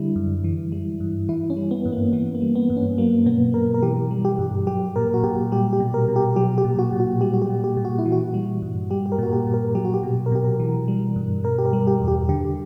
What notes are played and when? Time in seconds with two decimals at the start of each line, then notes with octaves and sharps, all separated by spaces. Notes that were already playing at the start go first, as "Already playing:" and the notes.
Already playing: D3 G3 E4
0.16 F#2
0.44 E3
0.72 G3
1.00 G2
1.29 E3 E4
1.50 C#4
1.57 G3
1.71 B3
1.85 G2
1.92 A#3
2.13 E3 B3
2.35 A#3
2.41 G3
2.55 B3
2.70 G2
2.77 C#4
2.98 F#3 A#3
3.26 B2 B3
3.54 B2 A#4
3.74 A#4
3.82 E3 G4
4.11 G3
4.25 G4
4.39 G2
4.67 F#3 G4
4.96 A#2 A#4
5.14 F#4
5.24 A#2 G4
5.52 G3 G4
5.73 G4
5.80 B2
5.94 A#4
6.08 B2
6.16 G4
6.36 F#3 G4
6.58 G4
6.65 A#2
6.79 F#4
6.93 A#2
7.00 F#4
7.21 G3 G4
7.34 F#4
7.42 G4
7.50 A#2
7.64 G4
7.77 A#2
7.85 F#4
7.99 E4
8.06 E3
8.12 F#4
8.34 G3
8.62 G2
8.90 G3 G4
9.06 G4
9.12 A#4
9.18 A#2 F#4
9.33 G4
9.47 A#2
9.54 A#4
9.75 F#3 G4
9.85 F#4
9.94 G4
10.03 B2
10.26 A#4
10.32 B2 G4
10.44 A#4
10.60 E3
10.88 G3
11.16 G2
11.44 B2 A#4
11.58 G4
11.66 A#4
11.73 G3
11.87 G4
12.01 E2
12.08 G4
12.29 D3 G4